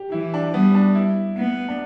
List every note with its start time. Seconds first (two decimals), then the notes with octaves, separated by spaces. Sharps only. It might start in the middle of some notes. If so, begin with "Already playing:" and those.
Already playing: G4
0.12 E3 E4
0.34 D4
0.54 G3 B3
0.75 D4
0.95 E4
1.37 B3
1.68 D4